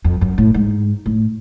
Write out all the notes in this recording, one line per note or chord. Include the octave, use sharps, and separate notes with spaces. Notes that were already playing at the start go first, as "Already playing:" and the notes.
F2
F#2
A2
G#2
A2